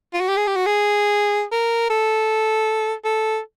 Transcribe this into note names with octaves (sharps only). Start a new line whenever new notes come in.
F4
F#4
G4
G#4
G4
F#4
G#4
A#4
A4
A4